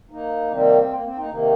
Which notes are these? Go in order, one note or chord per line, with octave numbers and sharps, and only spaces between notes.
A#3 D#4
C3 D#3 G3 A#3 C4
A#3
C4
A#3 D#4
C3 D#3 A#3